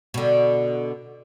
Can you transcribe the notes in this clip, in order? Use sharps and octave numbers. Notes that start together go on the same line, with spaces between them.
B2 D3